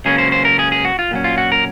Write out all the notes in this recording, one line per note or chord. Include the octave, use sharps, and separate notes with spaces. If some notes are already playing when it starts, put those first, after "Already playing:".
C#2 C#3 F#3 A#3 C#4 G#4
C5
C5
A#4
G#4
G#4
F#4
F4
A#2 F#3 C#4
F4
F#4
A#4